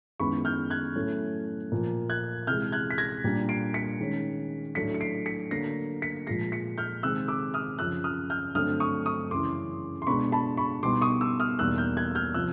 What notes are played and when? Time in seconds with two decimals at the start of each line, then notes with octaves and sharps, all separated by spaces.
0.20 F#2 D#3 G#3 B3 E4 B5 C#6
0.45 F6 G6
0.70 F#6 G#6
0.95 A2 F#3 A3 C#4 E4
1.72 A#2 F3 A#3
2.10 F#6 G#6
2.47 C3 E3 G#3 F6 G6
2.72 F#6 G#6
2.91 B6
2.98 G#6 A#6
3.24 A#2 G3 A#3 D4
3.49 C7 D7
3.74 B6 C#7
4.00 D#3 G#3 C#4
4.75 A2 F#3 A3 D4 B6 C#7
4.95 C#7
5.00 C7 D7
5.26 B6 C#7
5.51 D3 F#3 A#3 A#6 C7
6.02 B6 C#7
6.27 A#2 F3 G#3 A#6 C7
6.52 B6 C#7
6.78 F6 G6
7.03 C3 D#3 G#3 C4 E6 F#6
7.28 D6 E6
7.54 D#6 F6
7.79 F#2 C#3 F3 E6 F#6
8.04 D#6 F6
8.30 F6 G6
8.55 G2 D3 F#3 A3 C4 D#6 F6
8.80 C#6 D#6
9.06 C#6 D#6
9.31 F#2 C#3 E3 C6 D6
10.02 C6
10.07 B2 G#3 B3 D4 B5 C#6
10.32 A5 B5
10.57 B5 C#6
10.83 B2 G3 B3 D#4 C6 D6
11.02 C#6 D#6
11.21 D6 E6
11.40 D#6 F6
11.58 E2 B2 G3 A#3 D#4 E6 F#6
11.78 F6 G6
11.97 F#6 G#6
12.15 F6 G6
12.34 C3 F3 E6 F#6